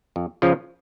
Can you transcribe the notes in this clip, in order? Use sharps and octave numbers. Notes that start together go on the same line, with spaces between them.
F2
C#3 F3 C#4 F4